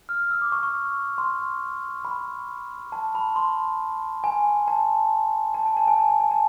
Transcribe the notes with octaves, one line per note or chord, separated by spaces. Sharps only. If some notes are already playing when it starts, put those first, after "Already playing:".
F6
E6
D6
C#6
C#6
C6
B5
A5
B5
C6
G#5
A5
A5
G#5
A5
G#5
A5
A5
G#5
A5